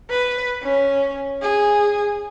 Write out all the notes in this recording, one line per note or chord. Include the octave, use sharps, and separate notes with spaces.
B4
C#4
G#4